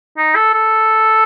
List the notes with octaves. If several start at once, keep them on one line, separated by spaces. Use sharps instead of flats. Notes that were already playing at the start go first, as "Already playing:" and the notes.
D#4
A4
A4